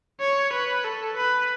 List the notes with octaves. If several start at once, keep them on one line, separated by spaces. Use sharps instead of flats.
C#5
B4
A4
B4